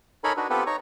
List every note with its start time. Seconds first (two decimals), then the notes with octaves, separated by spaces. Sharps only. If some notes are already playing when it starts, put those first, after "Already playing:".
0.24 D#4 A4 A#4 C#5 G#5 B5
0.37 D4 D#4 F#4 B4
0.50 B3 C4 F4 G4 A4 B4
0.67 D#4 C#5 A#5 C#6